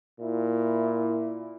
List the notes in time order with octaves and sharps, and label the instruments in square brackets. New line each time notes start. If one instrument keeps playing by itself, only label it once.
[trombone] A#2 [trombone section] E4